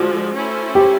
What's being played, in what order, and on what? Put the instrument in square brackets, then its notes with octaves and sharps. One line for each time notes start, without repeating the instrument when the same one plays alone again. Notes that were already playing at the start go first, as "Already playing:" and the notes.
Already playing: [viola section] D3 F3 G#3 [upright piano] F#4
[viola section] A3 C#4 E4 A4 C5
[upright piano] G4